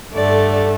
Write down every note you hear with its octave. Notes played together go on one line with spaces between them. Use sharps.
G2 D3 A3 D5